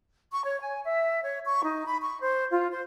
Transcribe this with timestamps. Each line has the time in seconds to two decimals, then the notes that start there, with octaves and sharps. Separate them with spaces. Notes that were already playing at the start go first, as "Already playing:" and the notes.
0.31 C#6
0.45 C#5
0.62 G#5
0.86 E5
1.23 C#5
1.45 C#6
1.64 D#4
1.86 B5
2.02 C#6
2.20 C5
2.51 F4
2.72 C5